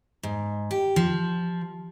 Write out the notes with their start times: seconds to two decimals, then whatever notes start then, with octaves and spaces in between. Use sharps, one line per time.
0.23 G#2
0.71 G4
0.96 F3